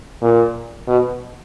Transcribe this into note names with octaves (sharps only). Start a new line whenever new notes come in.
A#2
B2